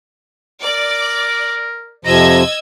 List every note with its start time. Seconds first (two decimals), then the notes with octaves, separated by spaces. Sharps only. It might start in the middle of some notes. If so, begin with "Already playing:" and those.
0.63 A#4 D5
2.05 F2 C3 F3 D#5 A#5 E6 G#6